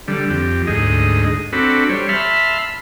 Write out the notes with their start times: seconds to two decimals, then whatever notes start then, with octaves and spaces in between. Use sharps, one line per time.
0.08 D3 G3
0.30 F2 G4
0.67 D2 G#2 G#4 D#5
1.53 C4 D4 F#4 A4 B5
1.89 G3 C5 C#5
2.09 E5 A5 B5 C6 F6